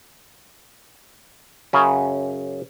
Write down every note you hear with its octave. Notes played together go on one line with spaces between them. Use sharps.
F#2 C#3 C#4